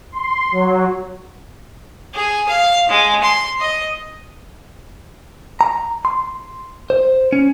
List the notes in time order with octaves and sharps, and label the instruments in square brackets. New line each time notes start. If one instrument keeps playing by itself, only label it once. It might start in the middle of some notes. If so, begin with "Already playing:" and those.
[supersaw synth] C6
F#3
[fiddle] G#4
F5
G#3
C6
D#5
[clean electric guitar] A#5
C6
C5
C#4